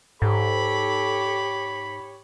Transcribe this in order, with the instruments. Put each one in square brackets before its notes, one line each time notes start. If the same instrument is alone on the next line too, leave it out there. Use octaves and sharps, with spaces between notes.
[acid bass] G#2 [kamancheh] G4 C#5 [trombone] A4 [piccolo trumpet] B5